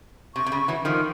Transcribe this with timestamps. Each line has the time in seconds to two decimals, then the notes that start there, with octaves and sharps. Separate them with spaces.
0.35 C3 C#6
0.46 C3
0.52 C#3
0.68 E3 F#3
0.85 D#3 F3